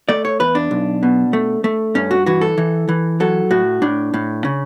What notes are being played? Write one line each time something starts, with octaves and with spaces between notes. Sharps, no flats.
A3 D5
C#5
E2 B4
D4
B1
B2
A3
A3
G2 C#4
F#4
E3 F#4
A4
E3
E3
F#3 A4
A2 F#4
A2 D4
A2
C#3